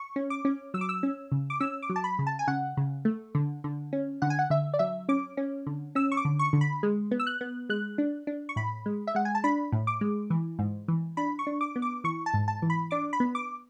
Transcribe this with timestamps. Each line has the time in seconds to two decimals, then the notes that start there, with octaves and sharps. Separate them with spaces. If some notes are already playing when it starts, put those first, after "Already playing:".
Already playing: C#6
0.16 C#4
0.30 D6
0.45 C#4
0.74 F#3 E6
0.81 D6
0.89 E6
1.03 C#4
1.32 C#3
1.50 D6
1.61 C#4 E6
1.82 D6
1.90 F#3
1.96 A5
2.04 B5
2.19 C#3
2.27 A5
2.39 G#5
2.47 C#3 F#5
2.77 C#3
3.05 A3
3.35 D3
3.64 D3
3.93 C#4
4.22 D3 F#5
4.30 G#5
4.39 F#5
4.50 D3 E5
4.74 D5
4.79 F#3 E5
5.09 C#4 D6
5.37 C#4
5.67 D3
5.95 C#4 E6
6.12 C#6
6.17 D6
6.25 D3
6.39 C#6
6.53 D3
6.61 B5
6.83 G#3
7.11 B3
7.19 E6
7.27 F#6
7.41 B3
7.69 G#3 F#6
7.98 D4
8.27 D4
8.49 C#6
8.56 A2 B5
8.86 G#3
9.07 E5
9.15 G#3 F#5
9.25 G#5
9.35 A5
9.44 D4 B5
9.72 A2
9.87 D6
10.01 G#3
10.30 E3
10.59 G#2
10.88 E3
11.17 D4 B5
11.39 C#6
11.47 D4
11.61 D6
11.76 B3
11.82 D6
12.04 E3 C#6
12.26 A5
12.34 G#2
12.48 A5
12.62 E3
12.70 B5
12.91 D4 D6
13.13 B5
13.20 B3
13.35 D6